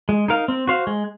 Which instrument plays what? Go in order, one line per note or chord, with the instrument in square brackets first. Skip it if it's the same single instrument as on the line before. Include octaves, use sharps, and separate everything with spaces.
[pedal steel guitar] G#3
D#4 A#4 F5
C4
F#4 C5 F5
G#3